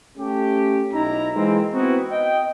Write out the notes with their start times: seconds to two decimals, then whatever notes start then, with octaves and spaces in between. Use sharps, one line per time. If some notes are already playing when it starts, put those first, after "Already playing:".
0.18 A3 C#4 G4
0.94 B1 D#4 E4 A#5
1.36 E3 G#3 A#3 C4
1.74 B3 C4 D#4 E4 F#4
2.11 D#5 G5